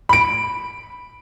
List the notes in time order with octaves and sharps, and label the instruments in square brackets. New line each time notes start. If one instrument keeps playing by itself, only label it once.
[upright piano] B5 D7